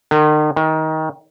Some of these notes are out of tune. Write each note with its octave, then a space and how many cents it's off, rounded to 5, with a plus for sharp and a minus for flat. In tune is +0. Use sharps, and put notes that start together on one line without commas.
D#3 -40
D#3 +20